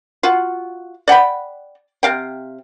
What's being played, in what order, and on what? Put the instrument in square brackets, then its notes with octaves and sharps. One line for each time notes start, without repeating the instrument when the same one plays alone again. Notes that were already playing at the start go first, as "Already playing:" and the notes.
[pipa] F4 F#4
D5 F#5 G5 B5
C3 F5 G5